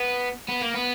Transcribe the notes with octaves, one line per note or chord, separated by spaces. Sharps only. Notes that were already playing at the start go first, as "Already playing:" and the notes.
Already playing: B3
B3
A#3
B3